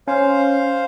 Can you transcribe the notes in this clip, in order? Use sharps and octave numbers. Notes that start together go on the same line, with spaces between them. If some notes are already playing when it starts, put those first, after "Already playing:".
C#4 C5 F5